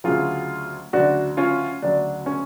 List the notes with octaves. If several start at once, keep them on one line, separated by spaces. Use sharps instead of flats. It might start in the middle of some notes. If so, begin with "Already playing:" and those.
D2 C#3 F#3 F4 G#4
D2 C#3 F#3 D4 F#4
C#4 F4
D2 C#3 F#3 D4
C#4